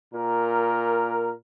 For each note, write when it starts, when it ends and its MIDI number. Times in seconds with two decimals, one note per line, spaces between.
0.13 1.31 46
0.13 1.31 70